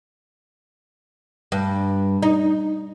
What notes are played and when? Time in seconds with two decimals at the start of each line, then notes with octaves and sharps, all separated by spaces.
1.52 G2
2.23 D#4